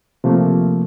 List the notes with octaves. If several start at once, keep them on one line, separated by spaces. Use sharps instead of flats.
C3 F3 A3 A#3